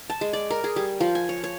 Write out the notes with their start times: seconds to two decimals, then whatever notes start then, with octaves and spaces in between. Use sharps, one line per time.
0.10 A5
0.21 G#3
0.33 D5
0.51 A#4
0.64 G#4
0.76 G3
1.00 F3
1.15 G#5
1.29 C#5
1.44 C#5